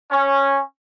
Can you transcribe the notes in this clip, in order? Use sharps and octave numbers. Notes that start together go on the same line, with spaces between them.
C#4